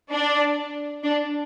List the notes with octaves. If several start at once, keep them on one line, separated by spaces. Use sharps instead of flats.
D4
D4